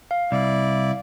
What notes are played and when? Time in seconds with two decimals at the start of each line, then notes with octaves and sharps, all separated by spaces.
0.11 F5
0.32 C2 E4 D5